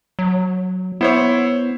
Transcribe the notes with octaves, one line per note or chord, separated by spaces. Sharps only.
F#3
B3 E4 C5 C#5